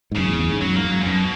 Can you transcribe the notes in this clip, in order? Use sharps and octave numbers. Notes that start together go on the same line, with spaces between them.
G#2
F#2 C#3
E2
E2
G#2
F#2 F#3
G#2 A#3
F#2
F#3
A#2
F#2 B2